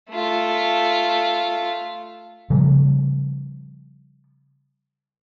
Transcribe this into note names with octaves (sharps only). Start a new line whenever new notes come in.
A3 F4
C#3 F3 G3